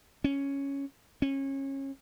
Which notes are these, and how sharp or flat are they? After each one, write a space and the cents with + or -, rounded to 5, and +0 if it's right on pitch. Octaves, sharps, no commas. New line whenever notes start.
C#4 +0
C#4 -25